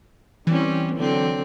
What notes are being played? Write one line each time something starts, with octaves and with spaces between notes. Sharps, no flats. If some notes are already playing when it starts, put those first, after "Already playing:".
E3 G3 C4 C#4
D3 F#3 C4